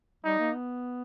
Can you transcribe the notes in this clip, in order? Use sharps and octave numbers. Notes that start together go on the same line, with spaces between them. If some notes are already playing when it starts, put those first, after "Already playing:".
G3 D#4
A#3
B3